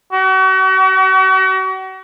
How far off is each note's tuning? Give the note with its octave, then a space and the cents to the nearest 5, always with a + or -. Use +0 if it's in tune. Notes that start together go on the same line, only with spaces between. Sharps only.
F#4 +40